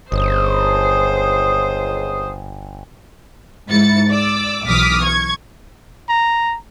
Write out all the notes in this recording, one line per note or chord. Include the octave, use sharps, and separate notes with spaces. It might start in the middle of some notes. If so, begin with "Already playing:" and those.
G1 C#2 C#3 C5 D#6
G#2 E4 A6 C#7
D5 D6 E6
B1 E3 D6 D#6 F6 B6
C#6 G#6
A#5